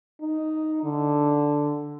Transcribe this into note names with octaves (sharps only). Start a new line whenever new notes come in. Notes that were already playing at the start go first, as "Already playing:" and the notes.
D#4
D3